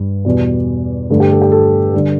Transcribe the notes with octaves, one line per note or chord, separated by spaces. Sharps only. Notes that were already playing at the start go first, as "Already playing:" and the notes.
Already playing: G2 G3
E2 B2 G3
G2 D3 A3
G4
A4
G4
A4
D3 G3